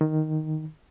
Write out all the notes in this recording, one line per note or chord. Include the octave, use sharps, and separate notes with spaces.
D#3